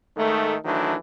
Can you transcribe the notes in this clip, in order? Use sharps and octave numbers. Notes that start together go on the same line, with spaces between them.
G#2 D#3 A3
D#3 E3 F#3 A3 D4